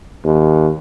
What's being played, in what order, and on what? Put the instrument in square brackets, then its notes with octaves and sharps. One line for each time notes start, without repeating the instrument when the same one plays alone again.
[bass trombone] D#2